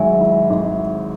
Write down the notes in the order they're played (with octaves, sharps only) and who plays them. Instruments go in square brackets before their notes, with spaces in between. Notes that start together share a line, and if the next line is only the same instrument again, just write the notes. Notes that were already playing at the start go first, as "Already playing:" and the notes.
Already playing: [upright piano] G#1 G#2 F#3 [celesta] E5 G#5
[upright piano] E4
G#1